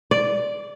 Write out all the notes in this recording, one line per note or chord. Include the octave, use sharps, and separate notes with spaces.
D5